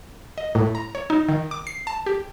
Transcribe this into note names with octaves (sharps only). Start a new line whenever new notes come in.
D#5
A2
A#5
C#5
D#4
D#3
D6
C7
A5
G4